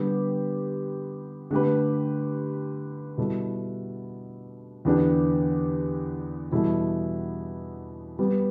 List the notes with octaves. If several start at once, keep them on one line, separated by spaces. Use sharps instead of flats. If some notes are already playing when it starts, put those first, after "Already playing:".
Already playing: D3 G3 B3 G4
D3 A3 G4 B4
B2 G3 E4 A4
E2 D3 B3 D4 G4
E2 B2 G3 E4 A4
G3 B3 G4